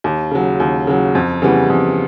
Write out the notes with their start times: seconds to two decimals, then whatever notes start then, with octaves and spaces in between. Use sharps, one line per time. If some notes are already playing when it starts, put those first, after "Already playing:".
0.04 D#2
0.31 C#3 F#3
0.60 D#2
0.87 C#3 F#3
1.15 F2
1.42 C#3 E3 G3 B3
1.70 F2